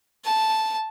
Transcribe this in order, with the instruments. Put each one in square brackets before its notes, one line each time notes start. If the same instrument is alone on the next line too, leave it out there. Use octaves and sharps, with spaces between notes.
[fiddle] A5